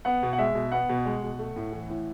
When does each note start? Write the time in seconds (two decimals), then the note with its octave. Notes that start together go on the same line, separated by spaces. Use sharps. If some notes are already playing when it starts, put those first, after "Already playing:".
0.05 B3 F#5
0.23 B2
0.33 F#5
0.38 G#3 E5
0.55 B2
0.72 B3 F#5
0.89 B2
1.05 G#3
1.22 B2
1.39 A3
1.56 A2
1.72 E3
1.89 A2